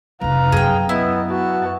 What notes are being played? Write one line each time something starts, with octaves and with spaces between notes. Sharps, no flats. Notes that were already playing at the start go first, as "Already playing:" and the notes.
F1 C#3 B4 F5 A#5
F#2 G#4 G5
B3 E4 D#5
B3 F#4 A5